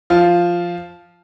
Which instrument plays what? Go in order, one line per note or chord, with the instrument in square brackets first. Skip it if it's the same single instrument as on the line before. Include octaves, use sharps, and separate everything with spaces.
[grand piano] F3 F4